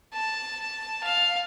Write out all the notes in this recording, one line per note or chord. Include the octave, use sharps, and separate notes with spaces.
A5
F5